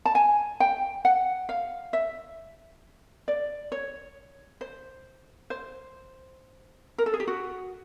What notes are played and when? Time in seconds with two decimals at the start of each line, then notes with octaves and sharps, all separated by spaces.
0.05 A5
0.15 G#5
0.60 G5
1.05 F#5
1.49 F5
1.93 E5
3.28 D5
3.72 C#5
4.61 C5
5.50 C5
6.98 A#4
7.06 A4
7.14 G#4
7.20 G4
7.27 F#4